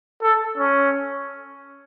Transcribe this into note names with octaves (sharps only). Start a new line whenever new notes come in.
A4
C#4